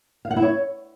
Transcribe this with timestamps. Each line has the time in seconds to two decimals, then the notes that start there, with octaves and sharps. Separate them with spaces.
0.25 F5
0.31 F#5
0.36 E4
0.42 C#5